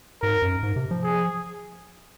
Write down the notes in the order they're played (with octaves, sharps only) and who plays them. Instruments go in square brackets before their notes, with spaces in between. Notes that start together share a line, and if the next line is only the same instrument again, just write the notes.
[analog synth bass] G#2 [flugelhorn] A#4
[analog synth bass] F#2
G#2
C3
F3
[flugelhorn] G#4